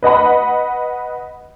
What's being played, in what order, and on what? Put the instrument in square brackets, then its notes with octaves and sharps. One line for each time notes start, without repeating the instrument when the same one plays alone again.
[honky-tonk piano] B4 D#5 F#5 B5